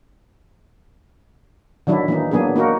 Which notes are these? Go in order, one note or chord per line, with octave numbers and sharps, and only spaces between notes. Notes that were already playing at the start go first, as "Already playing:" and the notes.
D#3 F#3 D4 E4
E3 A#3 D#4
F#3 A#3 B3 D4 G#4
A#3 D#4 F#4 A#4